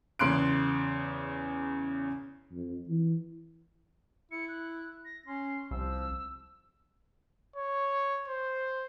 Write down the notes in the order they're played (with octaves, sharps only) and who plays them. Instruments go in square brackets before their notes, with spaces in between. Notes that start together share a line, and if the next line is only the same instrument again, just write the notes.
[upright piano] E2 C#3 C6 F#6 D7
[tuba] F2
E3
[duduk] E4 [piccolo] C#7
[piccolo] F#6
A#6
[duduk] C#4 [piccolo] C6
[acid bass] C2 [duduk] F3 [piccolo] E6
[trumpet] C#5
C5